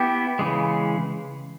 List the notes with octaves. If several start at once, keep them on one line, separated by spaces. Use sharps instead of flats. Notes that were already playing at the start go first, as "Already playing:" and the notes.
Already playing: B3 E4 G4
C#3 E3 G#3